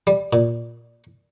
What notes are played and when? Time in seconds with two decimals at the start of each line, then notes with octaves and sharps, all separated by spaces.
0.07 G3
0.33 A#2